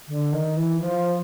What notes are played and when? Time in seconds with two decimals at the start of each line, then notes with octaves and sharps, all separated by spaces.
0.08 D3
0.32 D#3
0.57 E3
0.81 F3